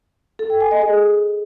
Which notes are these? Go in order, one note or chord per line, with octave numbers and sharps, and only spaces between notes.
A4
G5
G#5
D#5
G#4